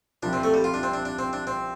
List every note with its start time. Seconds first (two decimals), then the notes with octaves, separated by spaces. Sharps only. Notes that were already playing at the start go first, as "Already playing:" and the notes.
0.23 C2 C3 F3 D4
0.33 C4
0.43 A3
0.54 G3
0.64 F4
0.74 D4
0.83 C4
0.93 D4
1.05 D4
1.19 C4
1.33 D4
1.47 C4